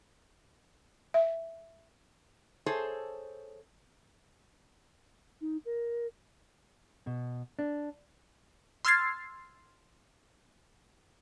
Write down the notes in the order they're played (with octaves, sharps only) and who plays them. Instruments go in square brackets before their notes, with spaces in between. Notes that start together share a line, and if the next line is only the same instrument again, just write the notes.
[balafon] E5
[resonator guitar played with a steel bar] G#4 A4 C5 C#5 E5
[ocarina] D#4
A#4
[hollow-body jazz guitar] B2
D4
[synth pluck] C6 E6 F6 G#6 A6 C7